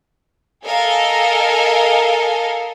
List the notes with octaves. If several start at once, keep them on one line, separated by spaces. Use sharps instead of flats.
A4 A#4 D#5 F5 G#5